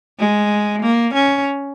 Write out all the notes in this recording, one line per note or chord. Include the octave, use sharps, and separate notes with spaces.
G#3
A#3
C#4